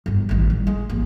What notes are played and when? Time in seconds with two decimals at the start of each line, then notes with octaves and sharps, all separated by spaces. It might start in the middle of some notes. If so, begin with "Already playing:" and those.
0.06 G1 G2
0.29 A1 D#3
0.50 G3
0.67 G#3
0.90 A1 D#2